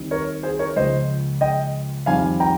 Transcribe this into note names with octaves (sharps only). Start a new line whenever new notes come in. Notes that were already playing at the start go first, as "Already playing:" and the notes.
Already playing: D#2 D#3 G3 C4 D#4
A#4 C#5
G#4 C5
A#4 C#5
C#2 C#3 F3 G#3 C5 D#5
D#5 G5
F2 D#3 G3 C4 F5 G#5
G5 A#5